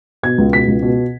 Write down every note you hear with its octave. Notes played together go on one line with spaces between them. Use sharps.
B2 G#6
C#2
B2 B6
C#2
B2